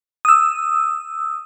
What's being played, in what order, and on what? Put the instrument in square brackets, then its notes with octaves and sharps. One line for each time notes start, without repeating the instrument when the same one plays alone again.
[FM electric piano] D#6 E6